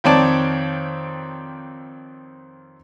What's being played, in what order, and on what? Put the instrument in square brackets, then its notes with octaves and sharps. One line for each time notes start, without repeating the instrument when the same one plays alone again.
[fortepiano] F2 D#3 C4 C#5 D5 A5